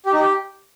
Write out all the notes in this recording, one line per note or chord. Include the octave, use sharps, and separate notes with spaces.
G4
D#4
G4